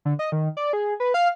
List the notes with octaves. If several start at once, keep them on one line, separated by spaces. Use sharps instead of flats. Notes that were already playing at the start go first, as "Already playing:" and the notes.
D3
D#5
D#3
D5
G#4
B4
F5